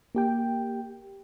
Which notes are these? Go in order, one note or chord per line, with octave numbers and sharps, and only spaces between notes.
A#3 G4 G5